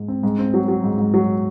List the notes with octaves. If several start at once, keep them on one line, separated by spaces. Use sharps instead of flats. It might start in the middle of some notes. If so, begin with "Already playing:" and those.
Already playing: G#2
C4
G#2
C4
F#3
F#3
G#2
G#2
F#3